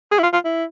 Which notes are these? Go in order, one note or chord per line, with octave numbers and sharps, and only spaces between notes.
G#4
E4
F4
F4
E4